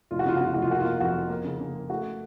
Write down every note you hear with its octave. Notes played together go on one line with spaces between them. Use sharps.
F1 F4
F#4
C#3 F4
F#4
C#3 F4
F1 F#4
F4
A#3 F#4
F4
A#3
F2 F#4
F2
A#3
C#3
C#3
A#3
A3 F#4